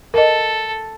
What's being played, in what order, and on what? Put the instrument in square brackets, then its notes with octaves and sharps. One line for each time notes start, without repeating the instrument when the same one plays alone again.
[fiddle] A4 [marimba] A#4 D#5